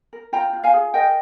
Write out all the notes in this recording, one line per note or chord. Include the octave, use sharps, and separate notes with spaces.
A#4
F4 G5 A#5
F4
F5 G#5
G#4
A#4 D#5 G5